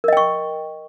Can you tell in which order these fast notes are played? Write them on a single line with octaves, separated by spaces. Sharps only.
A#4 D#5 G5 C#6